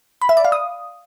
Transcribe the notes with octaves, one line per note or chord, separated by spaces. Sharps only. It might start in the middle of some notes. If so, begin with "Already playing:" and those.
B5
E5
D5
F5
D#6